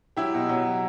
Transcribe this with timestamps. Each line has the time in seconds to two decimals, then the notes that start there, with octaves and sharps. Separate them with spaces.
0.17 F#3 E4 G4
0.34 B2
0.49 F#3